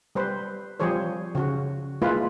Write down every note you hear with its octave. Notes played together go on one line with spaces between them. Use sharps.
G3 B4 C5
F3 G3 G#4 C5 C#5
C#3 F#4
G#3 A#3 E4 F4 B4